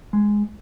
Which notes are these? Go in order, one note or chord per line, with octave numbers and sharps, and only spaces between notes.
G#3